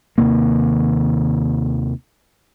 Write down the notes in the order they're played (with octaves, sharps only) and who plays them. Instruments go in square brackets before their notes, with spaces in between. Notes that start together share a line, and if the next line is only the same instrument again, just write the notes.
[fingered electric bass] D#2 C3 D#3 A#3